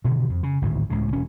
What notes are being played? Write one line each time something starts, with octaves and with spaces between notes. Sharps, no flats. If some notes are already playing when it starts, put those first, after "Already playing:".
G2 B2 D3 D#3
F2
C#3
G#1 D2 A2
C#2 A2 C#3
E1 C#4